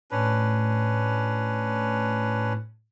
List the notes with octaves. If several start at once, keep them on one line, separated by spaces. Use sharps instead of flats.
A2 C#4 D4 B4